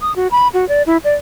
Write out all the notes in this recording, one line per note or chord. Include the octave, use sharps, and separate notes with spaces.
D#6
F#4
B5
F#4
D5
E4
D5